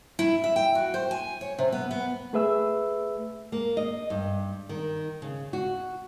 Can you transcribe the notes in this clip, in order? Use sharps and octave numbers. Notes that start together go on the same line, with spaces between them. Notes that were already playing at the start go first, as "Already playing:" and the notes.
E4
E5
G5
F#4
C5
G#5
C#5
C3
B3
B3
A3 G#4 B4 E5 E6
A#3
D#5
G2
D#3
C#3
F#4